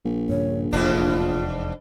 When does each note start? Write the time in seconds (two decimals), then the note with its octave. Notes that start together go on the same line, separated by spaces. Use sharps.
0.06 A#1
0.29 G2 C#3 C#5
0.73 F1 E2 G#2 B2 D4 F4